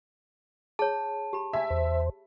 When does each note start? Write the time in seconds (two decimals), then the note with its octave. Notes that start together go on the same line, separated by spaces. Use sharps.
0.79 G#4 C#5 A5
1.33 G4 B5
1.53 E5 G#5
1.70 E2 C5